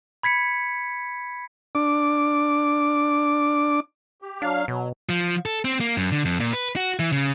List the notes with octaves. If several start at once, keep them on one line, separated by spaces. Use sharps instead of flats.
B5 G#6 B6 C#7
D4 D6
G4
F#3 D4 F5
B2 F#3
F3
A4
C4
A#3
F#2
D3
F2
A#2
B4
F#4
E3
C#3